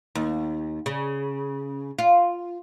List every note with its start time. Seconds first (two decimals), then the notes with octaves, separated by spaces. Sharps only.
0.15 D#2
0.86 C#3
1.99 F4